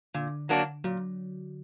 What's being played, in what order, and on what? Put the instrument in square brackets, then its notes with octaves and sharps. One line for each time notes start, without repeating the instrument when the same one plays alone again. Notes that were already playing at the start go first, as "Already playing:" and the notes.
[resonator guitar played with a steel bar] A#2 [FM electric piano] D3
[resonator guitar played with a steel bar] F#3 A#3 D4 F#4
[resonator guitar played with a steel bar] A#2 [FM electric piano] F#3